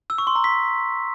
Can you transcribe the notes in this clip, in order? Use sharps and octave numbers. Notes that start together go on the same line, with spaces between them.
E6
C#6
C6
A#5
B6